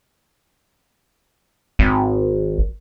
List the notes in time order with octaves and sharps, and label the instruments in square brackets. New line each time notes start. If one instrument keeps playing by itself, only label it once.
[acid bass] G#1